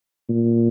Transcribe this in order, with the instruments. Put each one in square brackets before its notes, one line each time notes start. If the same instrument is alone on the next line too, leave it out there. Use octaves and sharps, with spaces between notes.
[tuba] A#2